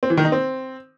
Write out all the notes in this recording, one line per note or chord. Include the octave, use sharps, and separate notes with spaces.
C4
E3
D#3
D#4
C4